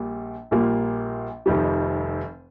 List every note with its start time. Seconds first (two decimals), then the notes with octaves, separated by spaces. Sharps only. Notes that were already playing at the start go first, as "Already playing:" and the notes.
Already playing: A#1 A#2 G3
0.51 A#1 A#2 G3 A#3 F4
1.46 F1 F2 D#3 G3